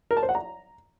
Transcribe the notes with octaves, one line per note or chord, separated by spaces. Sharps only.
A#4
A5
C5
F#5
A#5